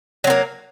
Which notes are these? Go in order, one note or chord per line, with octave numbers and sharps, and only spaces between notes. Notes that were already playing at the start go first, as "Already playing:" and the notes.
F#3 A#3 C4